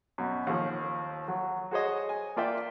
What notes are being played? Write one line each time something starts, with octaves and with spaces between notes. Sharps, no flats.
F#2 B2
D#2 F3
F#3
F#4 G#4 C5 C#5 D#5
G#5
A#3 F4 D5 E5 G5